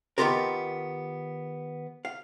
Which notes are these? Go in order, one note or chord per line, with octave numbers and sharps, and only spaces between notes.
D#3 B3 C4 F4 G4 A#4
F5